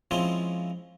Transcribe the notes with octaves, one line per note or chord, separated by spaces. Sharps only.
F3 G#3 C4 C#4 E4 F4